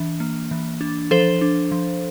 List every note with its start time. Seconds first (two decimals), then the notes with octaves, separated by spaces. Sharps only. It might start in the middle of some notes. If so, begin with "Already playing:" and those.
Already playing: E3 D4
0.20 A#3
0.51 E3
0.81 D4
1.11 F3 A4 C5
1.41 D4
1.72 F3